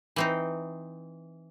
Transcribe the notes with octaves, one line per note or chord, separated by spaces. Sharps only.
E3 C4 D#4